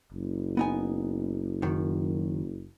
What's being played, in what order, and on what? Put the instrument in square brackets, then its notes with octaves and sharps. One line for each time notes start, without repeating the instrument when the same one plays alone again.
[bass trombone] F#1
[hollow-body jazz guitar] B3 D#4 G#5
F#2 D#3